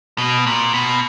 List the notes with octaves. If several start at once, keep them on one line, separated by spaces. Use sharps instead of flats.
B2
A#2
B2